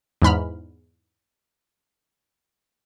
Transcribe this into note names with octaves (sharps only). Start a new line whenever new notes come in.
E2 G#2 B5 F6